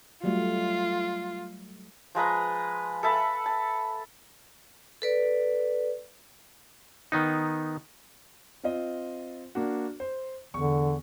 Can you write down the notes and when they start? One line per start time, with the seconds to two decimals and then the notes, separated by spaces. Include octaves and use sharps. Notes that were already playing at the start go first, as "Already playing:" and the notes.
0.24 F#3 G3 A3 F4
2.15 F3 G#3 B4 A#5
3.03 A4 E5 A5 B5
3.46 A5
5.02 A4 B4 D5
7.12 D#3 B3 D#4
8.63 C4 F4 D#5
9.55 A#3 D4 F#4
10.00 C5
10.54 E2 D3 C#6